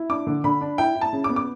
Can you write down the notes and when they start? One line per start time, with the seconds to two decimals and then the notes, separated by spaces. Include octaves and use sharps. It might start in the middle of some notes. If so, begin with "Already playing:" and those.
Already playing: E4
0.10 D4 D6
0.27 D3
0.44 D3 B5
0.61 D4
0.78 E4 G5
0.95 E4
1.01 A5
1.13 C#3
1.24 D6
1.30 B3
1.36 D6